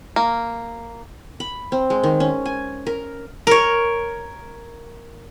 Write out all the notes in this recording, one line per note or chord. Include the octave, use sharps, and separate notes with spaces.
A#3
B5
C4
G#3
D#3
C#4
G#5
A#4
A#4 C#5